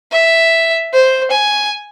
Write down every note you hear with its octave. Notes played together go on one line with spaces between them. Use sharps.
E5
C5
G#5